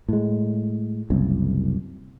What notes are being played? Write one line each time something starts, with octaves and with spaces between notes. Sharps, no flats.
A2 G#3
F#1 C2